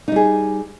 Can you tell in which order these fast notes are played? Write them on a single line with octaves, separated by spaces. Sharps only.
D#4 G3 G#4